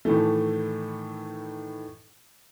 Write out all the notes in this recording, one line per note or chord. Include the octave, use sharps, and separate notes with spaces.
A2 D#3 E3 A3